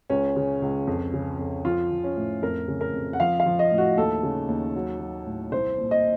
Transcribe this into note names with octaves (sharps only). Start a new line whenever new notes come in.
C#2 C#4
C#3
C#2
F2
C#3
F2
F3 F4
F3
C#4
A2
F2 A#4
C#3
A#4
F2
F#5
F3 F5
F5
F3
D#5
A2
F#4
D#2 A4
C#3
D#2
F#3
F#3
A2
C2 C5
A#2
D#5